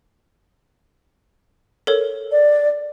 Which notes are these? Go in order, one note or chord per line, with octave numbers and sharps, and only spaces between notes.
A4 A#4 C#5
D5